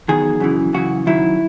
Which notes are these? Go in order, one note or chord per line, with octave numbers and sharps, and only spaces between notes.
E2 D#3 F#3 G#4
F#2 C#3 E3
F#2 C#3 E3 F#4
F#2 D#3 F#3 E4